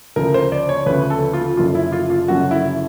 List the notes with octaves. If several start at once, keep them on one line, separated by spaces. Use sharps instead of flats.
D2 C#3 F3 A#4
C5
D5
C#5
D2 C#3 F3 B4
A4
F4
F#1 F#2 D3 F3 F4
E4
F4
F4
F#1 F#2 D3 F3 F#4
E4